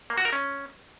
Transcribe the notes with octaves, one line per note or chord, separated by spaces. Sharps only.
A#3
F#4
A#4
C#4